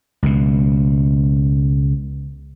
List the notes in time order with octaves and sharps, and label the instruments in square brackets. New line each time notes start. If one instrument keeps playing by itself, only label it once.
[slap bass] C#2 B2